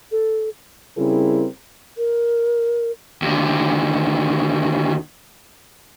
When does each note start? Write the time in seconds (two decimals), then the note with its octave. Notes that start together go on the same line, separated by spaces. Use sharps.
0.12 A4
0.97 C#3 G3 C4 E4 G#4 A#4
1.98 A#4
3.22 D#2 D3